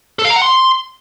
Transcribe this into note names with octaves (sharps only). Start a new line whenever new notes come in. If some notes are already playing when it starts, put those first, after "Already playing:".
A4
F5
A#5
F#5
C6